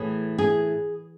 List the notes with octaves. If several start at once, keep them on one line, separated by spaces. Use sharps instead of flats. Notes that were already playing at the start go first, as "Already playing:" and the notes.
Already playing: A2 E3 G#4
G#4